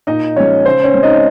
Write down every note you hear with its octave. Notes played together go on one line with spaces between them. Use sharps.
A#2 D#4 D#5
F3 G#3 C#4 C#5
C#3 C5
C#4 C#5
G#3 C4
D#4 D#5